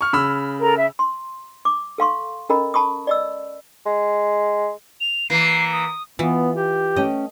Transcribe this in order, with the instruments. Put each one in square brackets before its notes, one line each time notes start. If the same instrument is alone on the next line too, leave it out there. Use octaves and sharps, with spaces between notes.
[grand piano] C#6 F6
C#3 B5 E6
[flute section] A4 A#4 A#5
E5
[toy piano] C6
D6
A4 F5 C6 C#6
C#4 A4 A#4 D#5 A#5 B5
A5 B5 C#6 D#6
D5 D#5 E6
[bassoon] G#3
[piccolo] F7
[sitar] E3 A#3 [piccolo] C7
[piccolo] D#6
[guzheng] E3 [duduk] B3 [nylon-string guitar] F4
[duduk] G4
[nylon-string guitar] A3 C#4 G5 [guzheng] D#5